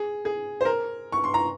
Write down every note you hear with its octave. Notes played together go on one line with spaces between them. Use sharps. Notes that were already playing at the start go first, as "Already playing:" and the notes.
Already playing: G#4
G#4
C5
A#4
C#6
C6
A#5